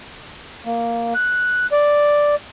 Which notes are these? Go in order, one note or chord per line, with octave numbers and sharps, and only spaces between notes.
A#3
F#6
D5